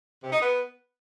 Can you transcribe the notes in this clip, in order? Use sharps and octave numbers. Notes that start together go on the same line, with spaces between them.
C3
D#4
B3